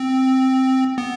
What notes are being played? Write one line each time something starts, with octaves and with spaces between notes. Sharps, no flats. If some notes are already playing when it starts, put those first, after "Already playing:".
Already playing: C4
B3